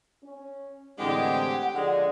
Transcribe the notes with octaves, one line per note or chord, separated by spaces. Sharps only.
C#4
A2 D3 E3 G#3 C4 D4 G4 F#5
D3 F3 G#3 D4